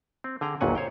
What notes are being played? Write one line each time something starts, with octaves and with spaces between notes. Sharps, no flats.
C4
D3 G#4 G5 A#5
G1 D#2 A#2 F#3 F#5 G#5
C5 C#5 F5 G5